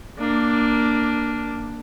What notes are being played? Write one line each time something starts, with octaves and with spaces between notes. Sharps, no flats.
A#3 D4